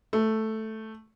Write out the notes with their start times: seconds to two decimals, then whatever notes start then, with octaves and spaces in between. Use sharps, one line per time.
0.13 A3